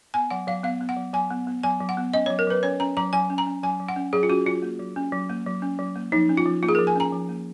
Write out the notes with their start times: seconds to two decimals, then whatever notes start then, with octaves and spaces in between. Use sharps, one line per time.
0.14 B3 G#5
0.31 F#3 F#5
0.47 F#3 F5
0.63 B3 F5
0.81 B3
0.89 F#5
0.97 F#3
1.14 F#3 G#5
1.30 B3
1.47 B3
1.63 F#3 G#5
1.81 F#3
1.89 F#5
1.97 B3
2.14 C#4 D#5
2.26 C#5
2.30 F#3
2.39 A#4
2.47 F#3 B4
2.63 C#4 C#5
2.80 C#4 A#5
2.97 F#3 A#5
3.13 F#3 G#5
3.30 C#4
3.38 A#5
3.46 C#4
3.63 F#3 G#5
3.80 F#3
3.89 F#5
3.96 C#4
4.13 F#3 G#4
4.23 F4
4.30 C#4 F#4
4.46 F#3 F4
4.62 A#3
4.79 F#3
4.96 C#4
5.12 F#3
5.29 A#3
5.46 F#3
5.62 C#4
5.79 F#3
5.96 A#3
6.12 F3 D#4
6.29 C#4
6.37 F4
6.46 F3
6.63 A#3 F4
6.69 G#4
6.75 A#4
6.79 F3
6.87 G#5
6.96 C#4 A#5
7.12 F3
7.29 A#3